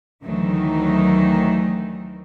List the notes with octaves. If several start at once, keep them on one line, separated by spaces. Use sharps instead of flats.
D2 D#3 E3 F#3 A3 D#4